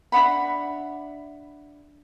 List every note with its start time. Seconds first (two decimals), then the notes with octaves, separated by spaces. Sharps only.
0.12 D4 E5 F#5 B5